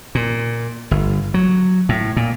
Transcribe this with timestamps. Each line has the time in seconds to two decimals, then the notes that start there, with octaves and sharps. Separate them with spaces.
0.15 A#2
0.91 G1
1.34 F#3
1.89 A2
2.16 A#2